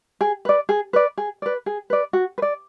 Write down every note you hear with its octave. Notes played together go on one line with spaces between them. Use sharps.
G#4
B4 D5
G#4
B4 D5
G#4
B4 D5
G#4
B4 D5
F#4
B4
D5